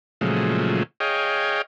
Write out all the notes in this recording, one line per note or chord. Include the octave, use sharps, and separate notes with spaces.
A#2 C#3 F3 F#3 G#3 A3
G#4 C#5 D#5 F5 G5